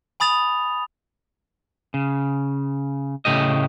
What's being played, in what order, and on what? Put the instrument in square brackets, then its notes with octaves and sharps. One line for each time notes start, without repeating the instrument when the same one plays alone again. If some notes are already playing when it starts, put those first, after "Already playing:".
[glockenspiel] G#5 B5 D#6 A6 F7
[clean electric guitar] C#3
A2 C#3 A3 G4 D#5